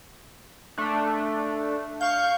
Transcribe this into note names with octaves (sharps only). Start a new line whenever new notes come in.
A3 D4
F5 C#6 G6